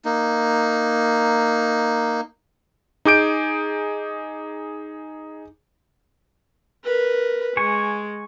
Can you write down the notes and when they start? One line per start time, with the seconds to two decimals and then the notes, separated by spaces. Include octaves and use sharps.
0.05 A#3 D#4
3.05 D#4 G#4 D6 G6 D7
6.84 A#4 B4
7.57 G#3 G#5 C#6